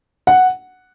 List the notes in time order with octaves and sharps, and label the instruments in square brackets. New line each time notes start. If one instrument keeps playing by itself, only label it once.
[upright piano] F#5